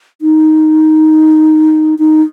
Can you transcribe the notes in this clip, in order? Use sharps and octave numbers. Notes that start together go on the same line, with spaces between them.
D#4
D#4